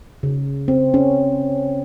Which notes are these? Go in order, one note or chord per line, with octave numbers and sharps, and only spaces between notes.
C#3
C4
C#4